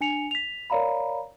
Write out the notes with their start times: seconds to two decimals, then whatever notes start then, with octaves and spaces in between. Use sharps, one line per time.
0.01 D4 G#5 C#7 F7
0.31 B6 F7
0.70 A#4 C#5 D5 F5 A#5 B5